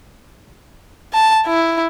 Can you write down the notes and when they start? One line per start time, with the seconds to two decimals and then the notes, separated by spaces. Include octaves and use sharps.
1.14 A5
1.47 E4